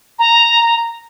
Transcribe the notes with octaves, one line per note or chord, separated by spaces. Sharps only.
A#5